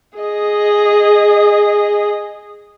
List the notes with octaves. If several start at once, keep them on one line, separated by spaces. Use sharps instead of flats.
G#4 D#5